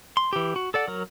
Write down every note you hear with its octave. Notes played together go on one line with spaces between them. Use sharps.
C6
E3 G4
F#4
A4 D5 F#5
F#3 A#4